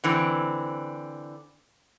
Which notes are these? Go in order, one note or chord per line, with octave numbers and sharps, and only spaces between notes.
D3 E3 C4